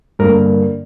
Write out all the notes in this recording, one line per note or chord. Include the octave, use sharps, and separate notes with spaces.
G2 D3 A#3 A#4